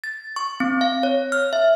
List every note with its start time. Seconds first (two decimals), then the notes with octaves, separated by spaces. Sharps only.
0.04 A6
0.36 C#6
0.60 C4
0.81 F5
1.03 C#5
1.32 F6
1.53 E5